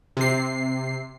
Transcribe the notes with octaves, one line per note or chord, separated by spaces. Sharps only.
C3 C7